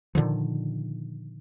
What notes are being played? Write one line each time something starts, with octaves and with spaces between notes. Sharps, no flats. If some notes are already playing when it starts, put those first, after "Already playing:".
A#2 D3 D#3 F3